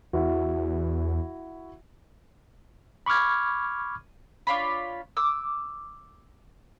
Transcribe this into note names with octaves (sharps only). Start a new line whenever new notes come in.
E2 E4 F#4
B5 C#6 D6 F6 G#6
D4 F4 C#5 B5
D6 E6